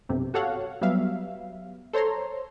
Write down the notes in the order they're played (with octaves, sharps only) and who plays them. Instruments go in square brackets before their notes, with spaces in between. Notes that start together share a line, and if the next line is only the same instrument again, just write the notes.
[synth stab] B1 G2 C3
F#4 G4 A4 C#5 F5 F#5
F#3 G3 B3 E5 F5
A4 C5 C#5 A#5 C6